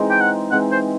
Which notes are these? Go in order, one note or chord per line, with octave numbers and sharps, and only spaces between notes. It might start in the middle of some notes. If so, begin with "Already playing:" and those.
Already playing: E3 G#3 C4 D#4
G5
F#5
E3 G#3 C4 D#4 F#5
C5